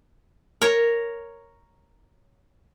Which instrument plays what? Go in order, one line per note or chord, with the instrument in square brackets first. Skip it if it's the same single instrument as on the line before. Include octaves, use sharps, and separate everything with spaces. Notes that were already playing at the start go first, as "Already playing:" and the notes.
[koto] A#4 C#5